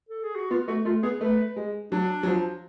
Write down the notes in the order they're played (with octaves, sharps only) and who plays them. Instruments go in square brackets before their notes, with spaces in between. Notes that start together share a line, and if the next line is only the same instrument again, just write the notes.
[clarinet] A4
G#4
F#4
[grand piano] B3 [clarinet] F4
[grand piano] A3 [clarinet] F#4
[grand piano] A3 [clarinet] F4
[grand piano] B3 [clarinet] G#4
[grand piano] A3 [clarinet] B4
[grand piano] G#3
[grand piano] F#3 [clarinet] D4
[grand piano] F#3
F3